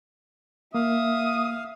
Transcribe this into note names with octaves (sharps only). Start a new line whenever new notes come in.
A#3 E5 F5 D#6